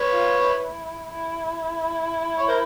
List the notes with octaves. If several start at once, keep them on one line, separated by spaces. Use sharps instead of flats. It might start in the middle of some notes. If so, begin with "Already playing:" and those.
Already playing: B4 C#5
F4
E4
E4
C#5
A#4 C5